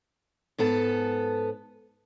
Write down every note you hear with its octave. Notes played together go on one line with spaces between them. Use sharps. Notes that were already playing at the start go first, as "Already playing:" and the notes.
G#2 B3 A4 A5